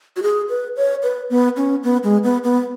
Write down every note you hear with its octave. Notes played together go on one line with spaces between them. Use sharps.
F#4
G#4
B4
C#5
B4
B3
C#4
B3
G#3
B3
B3